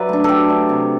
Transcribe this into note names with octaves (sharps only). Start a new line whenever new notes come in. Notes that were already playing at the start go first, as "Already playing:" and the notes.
Already playing: F#3 B4 D5 E5
A3 D4
F#3 G4 A4
A3 D4
C3